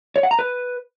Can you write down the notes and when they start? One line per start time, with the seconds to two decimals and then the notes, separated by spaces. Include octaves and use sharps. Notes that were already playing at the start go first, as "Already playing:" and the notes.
0.16 C#5
0.23 F#5
0.31 A#5
0.39 B4